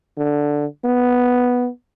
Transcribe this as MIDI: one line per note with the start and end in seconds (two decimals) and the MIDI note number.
0.17 0.65 50
0.85 1.68 59